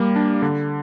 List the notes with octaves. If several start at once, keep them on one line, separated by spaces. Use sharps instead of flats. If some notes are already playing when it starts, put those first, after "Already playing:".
Already playing: G3 A#3
D4
D3